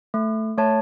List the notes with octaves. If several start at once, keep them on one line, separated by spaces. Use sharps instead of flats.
A3
A3 C#5 A5